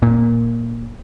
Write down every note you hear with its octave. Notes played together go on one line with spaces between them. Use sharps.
A#2